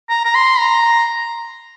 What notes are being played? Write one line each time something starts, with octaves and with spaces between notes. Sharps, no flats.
A#5
A#5
C6
A#5